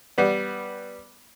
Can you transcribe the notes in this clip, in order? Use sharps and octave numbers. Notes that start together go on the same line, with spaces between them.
G3 B3